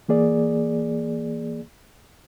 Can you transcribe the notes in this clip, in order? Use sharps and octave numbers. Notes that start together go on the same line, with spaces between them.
E3 A#3 G#4 D5